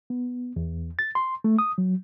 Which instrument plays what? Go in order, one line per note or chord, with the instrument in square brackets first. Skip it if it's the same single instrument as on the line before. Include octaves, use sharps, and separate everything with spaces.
[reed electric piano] B3
E2
A6
C6
A3
D#6
F#3